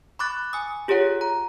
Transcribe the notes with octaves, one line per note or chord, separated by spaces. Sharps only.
B5 C#6 D6 F#6 A6
G#5 D#6
F4 G4 G#4 C#5 F#5
A#5